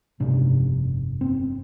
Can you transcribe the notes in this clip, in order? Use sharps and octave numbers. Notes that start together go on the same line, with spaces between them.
G1 F2 C3 D4
C4